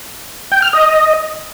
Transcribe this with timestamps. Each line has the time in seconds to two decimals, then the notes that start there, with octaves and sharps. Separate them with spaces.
0.52 G5
0.62 F6
0.73 D#5